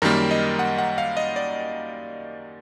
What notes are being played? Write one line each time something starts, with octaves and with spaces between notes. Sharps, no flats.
F#2 D#3 G3 A#3 A#4
D#5
F#5
F#5
F5
D#5
D5